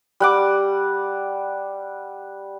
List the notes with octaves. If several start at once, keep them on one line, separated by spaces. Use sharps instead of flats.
G3 F#5 D6